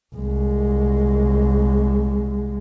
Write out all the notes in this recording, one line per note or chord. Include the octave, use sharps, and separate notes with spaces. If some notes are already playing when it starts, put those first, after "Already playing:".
C2 G#3